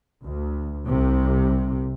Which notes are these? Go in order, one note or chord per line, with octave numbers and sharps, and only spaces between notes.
D2
C2 C3